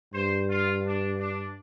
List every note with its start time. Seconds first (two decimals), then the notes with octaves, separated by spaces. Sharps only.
0.14 G2 C5
0.49 F4
0.85 D4
1.19 D4